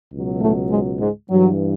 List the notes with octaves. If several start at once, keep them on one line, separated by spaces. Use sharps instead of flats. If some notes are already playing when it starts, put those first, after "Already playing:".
C#2 B2 F#3
A2 A3
G#2 G#3
G#2 G#3
G2 E3 F#3